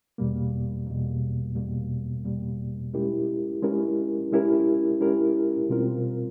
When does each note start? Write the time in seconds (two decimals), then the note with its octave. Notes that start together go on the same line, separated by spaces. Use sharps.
0.18 E2 B2 G3 A#3
0.86 E2 B2 G3 A#3
1.56 E2 B2 G3 A#3
2.24 E2 B2 G3 A#3
2.94 G#3 C#4 E4 G4 A#4
3.62 G#3 C#4 E4 G4 A#4
4.32 G#3 C#4 E4 G4 A#4
5.00 G#3 C#4 E4 G4 A#4
5.70 B2 G3 C4 F4 A#4